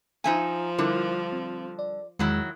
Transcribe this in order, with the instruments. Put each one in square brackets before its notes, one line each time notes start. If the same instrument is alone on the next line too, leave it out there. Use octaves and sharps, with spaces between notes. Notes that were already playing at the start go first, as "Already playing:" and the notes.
[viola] F3 [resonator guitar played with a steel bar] D#4 E5 G#5
[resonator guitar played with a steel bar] D3 G3 [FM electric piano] E4 A#4
[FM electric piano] C4
D5
[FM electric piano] E2 G#3 [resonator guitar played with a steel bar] D#3 F#3 E4